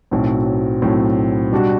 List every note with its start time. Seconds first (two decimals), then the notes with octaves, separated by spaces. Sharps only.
0.11 B1 A2 F#3 C4
0.82 B1 A2 F#3 C4
1.52 B2 G3 D4 F#4